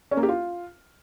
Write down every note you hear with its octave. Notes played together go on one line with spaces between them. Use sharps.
C#4
A#3
G4
F4